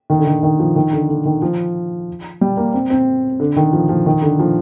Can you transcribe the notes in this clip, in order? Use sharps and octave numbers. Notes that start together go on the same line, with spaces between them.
D#3
D3
D#3
D#3
F3
D#3
D3
D3
D#3
F3
G3
A#3
C4
C4
D3
D#3
F3
F3
D#3
D3
F3